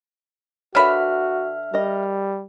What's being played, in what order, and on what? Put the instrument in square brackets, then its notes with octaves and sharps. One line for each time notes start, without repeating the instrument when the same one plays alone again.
[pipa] D3 B5 [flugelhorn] F#4 [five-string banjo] A#4 B4 C#5 [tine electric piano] E5 F6
[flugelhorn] G3 [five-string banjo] A#4 D#5